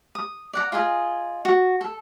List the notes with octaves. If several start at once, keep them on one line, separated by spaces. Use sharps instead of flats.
D#6
D5 F#5 A#5
F4 G#4 D#5 G#5
F#4
A4